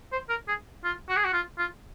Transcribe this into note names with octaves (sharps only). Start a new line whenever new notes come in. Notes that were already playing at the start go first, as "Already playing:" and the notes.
C5
A#4
G#4
F4
F#4
G#4
F#4
F4
F4